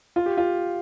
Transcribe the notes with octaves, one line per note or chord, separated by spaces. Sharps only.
F4
G4
F4